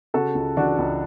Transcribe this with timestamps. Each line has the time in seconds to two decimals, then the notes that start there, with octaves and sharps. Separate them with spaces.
0.14 C#3 F#4 A4
0.35 C#2
0.57 E3 D4 F#4
0.79 C#2